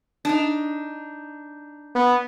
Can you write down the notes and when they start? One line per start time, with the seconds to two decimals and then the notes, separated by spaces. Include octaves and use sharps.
0.25 D4 D#4
1.95 B3